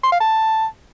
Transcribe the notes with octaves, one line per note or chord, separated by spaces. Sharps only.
C6
F5
A5